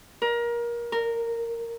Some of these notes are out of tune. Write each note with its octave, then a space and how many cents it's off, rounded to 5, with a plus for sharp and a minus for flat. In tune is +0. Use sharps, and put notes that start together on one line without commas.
A#4 +25
A#4 -10